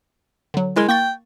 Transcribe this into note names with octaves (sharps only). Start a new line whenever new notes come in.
D3 F#3
G#3 E4 A#4 C6
A#3 G5 C#6 A6